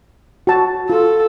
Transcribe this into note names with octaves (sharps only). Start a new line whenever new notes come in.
F#4 A5
F4 A4